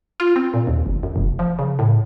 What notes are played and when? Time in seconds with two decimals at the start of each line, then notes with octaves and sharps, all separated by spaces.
0.20 F4
0.36 C4
0.54 A#2
0.67 D#2
0.86 G1
1.03 F#2
1.16 F1
1.39 F3
1.59 C#3
1.79 A2